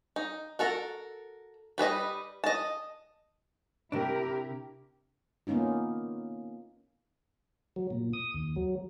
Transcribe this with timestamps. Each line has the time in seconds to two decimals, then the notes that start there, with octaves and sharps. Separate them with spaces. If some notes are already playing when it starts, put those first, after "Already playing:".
0.16 D#4
0.59 F#4 A4 A#4
1.78 G3 B4 C5 D#5
2.44 D#5 A5
3.92 C3 D4 E4 G4 A#4
5.47 A#3 B3 C#4 D#4 F4
7.76 F#3
7.90 A#2
8.13 D#6
8.34 D#2
8.56 F#3